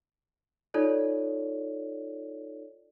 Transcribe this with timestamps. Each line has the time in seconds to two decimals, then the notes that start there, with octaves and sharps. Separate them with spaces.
0.74 D#4 F4 A4 C#5 D5